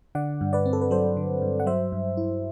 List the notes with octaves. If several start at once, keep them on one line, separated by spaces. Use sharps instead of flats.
D3 D5 F#5
G2
B4 D5
C4
A4
B4
F#3 A4 C5
D3
G2
F#5
F#3 C5 E5
G2
E4